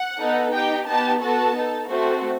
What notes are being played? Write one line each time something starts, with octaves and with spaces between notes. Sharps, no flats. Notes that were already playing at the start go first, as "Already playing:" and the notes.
Already playing: F#5
B3 D#4 A4
D#4 G4 G5
B3 D#4 G4 A5
B3 F#4 A4 A5
D#4 A4
A3 C4 F#4 A4 C5